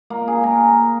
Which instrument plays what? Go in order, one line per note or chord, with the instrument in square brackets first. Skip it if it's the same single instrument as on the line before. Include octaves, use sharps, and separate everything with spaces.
[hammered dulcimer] A#3
G#4
A#4